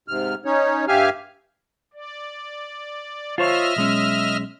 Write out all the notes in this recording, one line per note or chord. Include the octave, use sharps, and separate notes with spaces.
G#2 C3 F6
C#4 D#4 C#5
G2 G4 E5 F5 G#5 F6
D5
F4 C5 C#5 D#5 E5 F6
B1 G#3 C#4